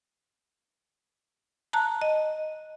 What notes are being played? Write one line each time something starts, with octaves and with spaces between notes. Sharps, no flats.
A5 A#5 F#6
D#5